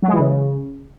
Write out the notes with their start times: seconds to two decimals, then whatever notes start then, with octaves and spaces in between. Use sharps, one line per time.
0.02 F#3
0.08 G#3
0.13 E3
0.19 C#3